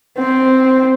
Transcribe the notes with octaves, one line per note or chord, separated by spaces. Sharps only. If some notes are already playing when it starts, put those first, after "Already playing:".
C4